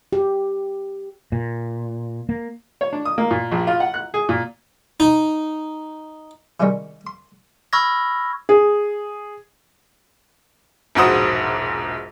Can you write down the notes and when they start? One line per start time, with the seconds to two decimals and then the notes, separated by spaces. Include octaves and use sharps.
0.13 G4
1.32 A#2
2.29 A#3
2.81 C#5
2.93 D4
3.05 D#6
3.18 A#3
3.31 A#2
3.52 A#1
3.67 F4
3.80 F#5
3.94 F#6
4.14 G#4
4.29 A#2
5.00 D#4
6.60 C3 D#3 E3 G3 G#3 C#4
7.07 C6
7.73 B5 C#6 E6 F6 G#6 A#6
8.49 G#4
10.95 E1 A#1 G#2 F#4 C5 D#6